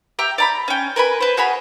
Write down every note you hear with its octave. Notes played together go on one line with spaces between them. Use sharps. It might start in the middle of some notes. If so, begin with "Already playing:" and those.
G4 E5 G5 A#5
D5 A#5 B5
C#4 G5
A#4 B4 G#5 B5
B4 C5
F#4 G#4 A#4 B5